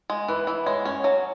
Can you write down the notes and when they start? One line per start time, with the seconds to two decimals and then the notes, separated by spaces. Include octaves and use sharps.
0.10 G#3
0.28 E3 B4
0.47 E3
0.66 G#3 C#5
0.85 C#4 C#5
1.04 F#3